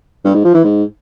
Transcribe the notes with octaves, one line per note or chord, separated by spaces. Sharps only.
G2
G#2
F3
E3
G#2